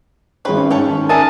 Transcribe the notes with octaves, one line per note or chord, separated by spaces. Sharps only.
G#1 C4 G#4 B4 C#5 B5
C#4
G#2 A4 C#5 G5
D#3
D4 G#4 A#4 E5 A5 D#6